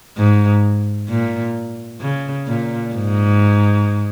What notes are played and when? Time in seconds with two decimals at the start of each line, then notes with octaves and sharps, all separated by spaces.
0.17 G#2
1.09 A#2
2.01 C#3
2.47 A#2
2.94 G#2